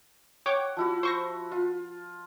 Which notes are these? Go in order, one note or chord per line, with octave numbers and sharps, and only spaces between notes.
C#5 F#5 G5 D6
F3 E4 F#4
C5 C#6 A#6
F4